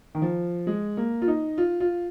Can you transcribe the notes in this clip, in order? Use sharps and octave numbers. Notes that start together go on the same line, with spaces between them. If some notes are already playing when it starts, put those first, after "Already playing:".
D#3
F3
G#3
A#3
F4
D#4
F4
F4